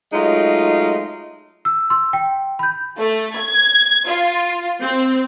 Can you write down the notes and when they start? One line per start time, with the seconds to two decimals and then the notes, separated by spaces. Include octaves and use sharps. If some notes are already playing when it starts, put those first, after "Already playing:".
0.12 F#3 G#3 A3 D#4 F4
1.65 E6
1.90 C6 E6
2.13 G5
2.59 B5 G6
2.97 A3
3.37 G#6
4.08 F4
4.81 C4